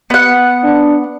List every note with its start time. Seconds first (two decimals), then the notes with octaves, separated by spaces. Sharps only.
0.10 B3 F#5
0.63 D4